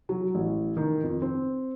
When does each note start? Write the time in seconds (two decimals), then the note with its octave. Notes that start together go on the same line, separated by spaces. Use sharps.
0.09 F#3
0.35 A1
0.77 D#3
1.03 F2
1.22 C4